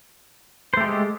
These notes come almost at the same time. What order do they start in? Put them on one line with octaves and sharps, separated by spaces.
C5 A3 G4 G#3